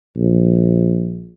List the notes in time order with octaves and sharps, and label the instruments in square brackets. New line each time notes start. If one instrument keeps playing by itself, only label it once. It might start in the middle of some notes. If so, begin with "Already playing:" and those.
[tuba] A#1